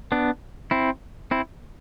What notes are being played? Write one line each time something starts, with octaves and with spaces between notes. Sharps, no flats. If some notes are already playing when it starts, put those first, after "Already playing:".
B3 D4
C4 E4
C4 E4